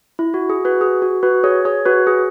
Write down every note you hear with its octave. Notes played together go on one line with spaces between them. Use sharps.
E4
F#4
G#4
F#4 B4
G#4
F#4
F#4 B4
G#4 C#5
G#4 C#5
F#4 B4
G#4